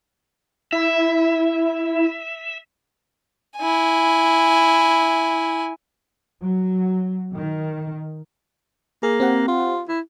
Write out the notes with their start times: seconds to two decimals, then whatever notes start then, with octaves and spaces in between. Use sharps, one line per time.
0.72 E4 E5
3.57 E4 G#5
6.42 F#3
7.34 D#3
9.03 A#3 G#4
9.20 C4 G4 F#5
9.48 F4
9.88 E4